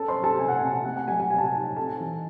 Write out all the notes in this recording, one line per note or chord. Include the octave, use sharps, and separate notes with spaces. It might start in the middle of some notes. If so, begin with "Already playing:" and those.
Already playing: C#4 A4 A5
C5 C6
F#3
A4 A5
C3 G#5
F#5
C3 G#5
A3 F#5
F#5
F#3 G#5
G#5
C3 G#5
A5
G#5
D#4
C4 A4 A5
E3